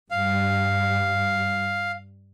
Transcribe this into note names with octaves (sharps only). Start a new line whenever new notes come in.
G2 G3 F5